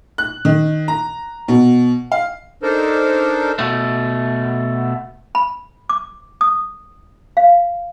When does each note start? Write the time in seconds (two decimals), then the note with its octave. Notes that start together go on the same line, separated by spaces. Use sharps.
0.18 F#6
0.45 D#3
0.88 A#5
1.48 B2
2.12 F5
2.63 D4 D#4 A4 A#4 C5
3.59 B2 A3
5.35 B5
5.89 D6
6.41 D#6
7.37 F5